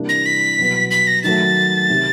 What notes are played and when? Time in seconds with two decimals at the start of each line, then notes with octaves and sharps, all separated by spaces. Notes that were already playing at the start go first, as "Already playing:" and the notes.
Already playing: C3 E3 G3 A#3 D4
0.09 A#6
0.26 B6
0.58 B2 F#3 B3
0.91 B6
1.07 A#6
1.24 D#3 F#3 A3 A6
1.90 C3 D#3